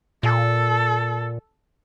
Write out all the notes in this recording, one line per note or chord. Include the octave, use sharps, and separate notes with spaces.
A#2 A4